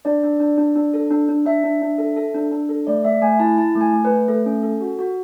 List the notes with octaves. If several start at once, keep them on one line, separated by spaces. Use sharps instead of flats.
D4 D5
D4
D4
D4
D4
A4
D4
D4
D4 E5
D4
D4
A4
A4
D4
D4
A4
A3 D5
A3 E5
A3 G#5
E4 A5
E4 A5
A3
G#5
A3
B4
A3
A3 A4
C#4
A4
F#4
F#4